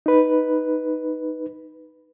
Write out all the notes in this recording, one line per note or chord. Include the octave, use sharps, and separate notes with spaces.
D#4 B4